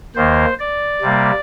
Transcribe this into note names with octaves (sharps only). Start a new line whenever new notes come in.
D#2 D#3 A#3 C5
D5
C3 G3 A#3